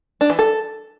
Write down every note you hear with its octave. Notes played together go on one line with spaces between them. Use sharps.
D4
E3
A4